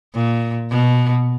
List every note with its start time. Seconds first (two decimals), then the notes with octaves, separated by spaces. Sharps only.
0.14 A#2
0.70 B2